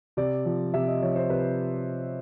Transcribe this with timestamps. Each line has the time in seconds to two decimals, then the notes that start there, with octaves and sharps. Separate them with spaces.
0.17 C3 D5
0.45 F3
0.74 C3 E5
0.88 D#5
1.02 F3 C#5
1.16 C5
1.30 C3 B4